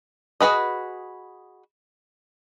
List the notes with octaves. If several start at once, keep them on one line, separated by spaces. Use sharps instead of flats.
F#4 G#4 B4 D#5